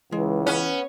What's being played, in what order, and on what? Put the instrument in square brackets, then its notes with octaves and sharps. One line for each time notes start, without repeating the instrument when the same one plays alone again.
[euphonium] C#2 [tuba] E3 [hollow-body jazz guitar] G#3
[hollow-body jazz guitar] B3 F#5 [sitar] C#4